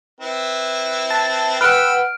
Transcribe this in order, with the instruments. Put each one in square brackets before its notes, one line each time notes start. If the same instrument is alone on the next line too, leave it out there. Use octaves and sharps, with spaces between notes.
[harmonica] C4 E4 B4
[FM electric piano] A5
[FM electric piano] B4 F#5 [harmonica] G5 B5 E6 [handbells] F6 D7